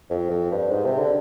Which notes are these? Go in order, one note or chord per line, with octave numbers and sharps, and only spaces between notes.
F2
F2
G2
G#2
C3
D3